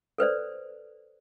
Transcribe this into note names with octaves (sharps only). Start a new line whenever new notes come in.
A4 B4 C5 D5